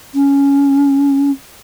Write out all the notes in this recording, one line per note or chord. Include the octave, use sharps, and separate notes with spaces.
C#4